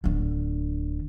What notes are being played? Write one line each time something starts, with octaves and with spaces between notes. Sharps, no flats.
D1 D3